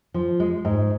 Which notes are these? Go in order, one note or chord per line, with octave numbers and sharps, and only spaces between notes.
F3
G#3
G#2